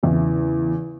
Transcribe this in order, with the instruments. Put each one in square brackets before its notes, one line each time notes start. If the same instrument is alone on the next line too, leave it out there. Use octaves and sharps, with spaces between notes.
[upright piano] E2 C#3 E3